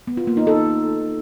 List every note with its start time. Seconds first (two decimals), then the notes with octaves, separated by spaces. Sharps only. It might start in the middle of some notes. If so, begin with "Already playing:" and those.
0.07 B3
0.17 F4
0.27 A#3
0.37 D#4
0.47 A4